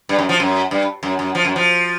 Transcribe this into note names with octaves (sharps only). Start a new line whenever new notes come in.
G2
F#2
F3
F#2
G2
F#2
F#2
F3
F#2
F3